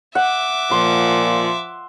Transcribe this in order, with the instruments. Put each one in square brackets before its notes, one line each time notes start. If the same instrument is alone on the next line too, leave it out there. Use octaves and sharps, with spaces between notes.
[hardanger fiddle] E5 D6 [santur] F#5
[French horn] A#2 [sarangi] F3 [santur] C6